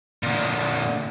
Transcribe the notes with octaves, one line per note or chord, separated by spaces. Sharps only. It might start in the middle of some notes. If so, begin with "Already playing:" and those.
A#2 D3